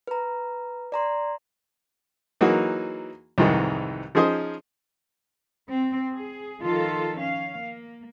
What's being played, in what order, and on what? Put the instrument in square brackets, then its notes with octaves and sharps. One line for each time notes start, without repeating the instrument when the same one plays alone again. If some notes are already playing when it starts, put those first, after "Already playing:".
[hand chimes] B4 A#5
D5 A#5 C6
[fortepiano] E3 F#3 A#3 D#4 F#4 G#4
C2 F2 G#2 D#3 E3 G#3
F3 C#4 D#4 G#4 C5 D#5
[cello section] C4
G#4
D#3 F3 F4 A4
C#4 F5
A#3